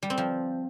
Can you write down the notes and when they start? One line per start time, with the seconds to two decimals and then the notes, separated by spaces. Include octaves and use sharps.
0.03 G3
0.10 C4
0.18 F3